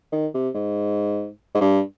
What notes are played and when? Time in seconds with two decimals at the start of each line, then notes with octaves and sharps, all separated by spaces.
0.12 D#3
0.34 C3
0.54 G#2
1.54 G#2
1.61 G2